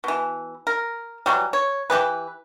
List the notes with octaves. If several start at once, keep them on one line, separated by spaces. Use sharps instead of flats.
B2 E3
A#4
E3 F#3 G3
C#5
E3 G4 G#4 B4